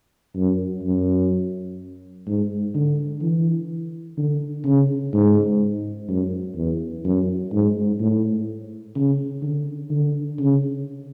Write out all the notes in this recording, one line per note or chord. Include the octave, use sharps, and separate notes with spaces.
F#2
F#2
G#2
D3
E3
D3
C#3
G#2
F#2
E2
F#2
G#2
A2
C#3
D3
D3
C#3